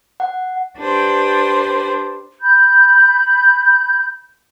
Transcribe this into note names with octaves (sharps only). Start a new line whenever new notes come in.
F#5
D4 G4 B4 C5
B5 G6